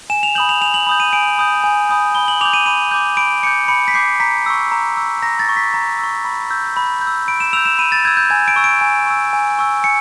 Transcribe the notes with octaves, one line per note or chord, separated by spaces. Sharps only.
G#5 E7
F7
B5 D#6 G6 F#7
F7
G#5 F7
F#7
B5 D#6 G6
D#7
G#5 D7
B5 D#6 G6
G#5
B5 D#6 G6
B5 G7
F#7
D6 G6 F7
D#7
B5 D#7
D6 G6
B5 D7
D6 G6 C#7
B5 C#7
B6
D6 G6 C7
A#5 B6
C#6 E6
A#5
C#6 E6
A#5 A#6
A6
C#6 E6
B6
A#5
C#6 E6
B5
E6 G6
B5
G6
E6
B5 D7
E7
E6 G6 F7
E7
B5 D#7
A6
E6 G6 G#6
G6
G#5 G#6
D7
C#6 E6
D7
G#5
C#6 E6
G#5
C#6 E6
G#5 C#7